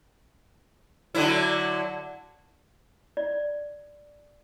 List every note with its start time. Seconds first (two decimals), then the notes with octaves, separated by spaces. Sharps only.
1.15 D3 F#3 E4
3.17 D5